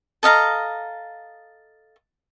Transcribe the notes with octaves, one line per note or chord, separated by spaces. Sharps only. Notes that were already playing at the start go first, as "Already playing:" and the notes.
A4 D#5 F5 A#5